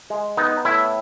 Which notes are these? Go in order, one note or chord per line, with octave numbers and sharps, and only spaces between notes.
G#3
B3 D#4
A2 E4